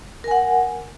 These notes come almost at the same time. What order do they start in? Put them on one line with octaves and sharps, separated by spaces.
A#4 G#5 F#5